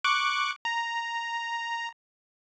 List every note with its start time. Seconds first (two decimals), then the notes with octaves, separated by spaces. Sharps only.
0.04 C#6 D6 F#6
0.65 A#5